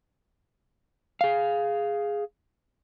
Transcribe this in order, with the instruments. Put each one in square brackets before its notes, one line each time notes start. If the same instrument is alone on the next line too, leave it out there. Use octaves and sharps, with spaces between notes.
[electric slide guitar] G#4 F5